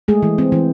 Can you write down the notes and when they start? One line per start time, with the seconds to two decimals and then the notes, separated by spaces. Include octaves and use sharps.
0.08 G#3 A3 G#4
0.23 E3
0.38 C4
0.52 E3